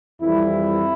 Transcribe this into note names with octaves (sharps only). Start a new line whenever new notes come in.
F2 E3 G3 E4